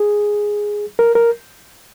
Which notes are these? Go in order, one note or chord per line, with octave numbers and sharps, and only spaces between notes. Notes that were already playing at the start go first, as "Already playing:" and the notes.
Already playing: G#4
A#4
A#4